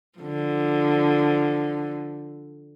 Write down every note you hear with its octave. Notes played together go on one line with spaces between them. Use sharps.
D3 F3